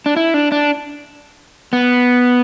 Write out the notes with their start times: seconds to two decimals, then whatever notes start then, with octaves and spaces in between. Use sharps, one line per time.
0.06 D4
0.16 E4
0.34 D4
0.52 D4
1.73 B3